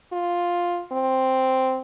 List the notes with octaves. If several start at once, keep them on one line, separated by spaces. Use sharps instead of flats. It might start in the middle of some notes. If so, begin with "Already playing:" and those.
F4
C4